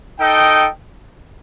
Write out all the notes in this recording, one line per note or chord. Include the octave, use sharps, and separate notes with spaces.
D#4 A4 D#5 G5